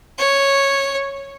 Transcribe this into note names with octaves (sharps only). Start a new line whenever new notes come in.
C#5